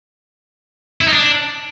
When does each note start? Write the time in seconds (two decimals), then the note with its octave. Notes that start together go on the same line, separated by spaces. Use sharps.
1.01 E4
1.07 D#4
1.13 D4